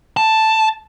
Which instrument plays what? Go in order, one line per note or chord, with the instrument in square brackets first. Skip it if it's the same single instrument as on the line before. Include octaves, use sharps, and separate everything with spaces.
[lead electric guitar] A5